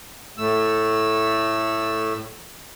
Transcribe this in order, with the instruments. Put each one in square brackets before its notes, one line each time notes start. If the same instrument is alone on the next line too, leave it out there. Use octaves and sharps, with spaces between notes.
[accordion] A2 A3 E6